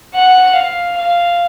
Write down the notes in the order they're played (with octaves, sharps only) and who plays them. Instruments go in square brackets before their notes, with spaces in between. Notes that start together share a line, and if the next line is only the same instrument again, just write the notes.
[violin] F#5
F5
F5